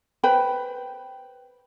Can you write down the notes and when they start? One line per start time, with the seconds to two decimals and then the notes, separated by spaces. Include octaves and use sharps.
0.24 B4 C5 G5 B5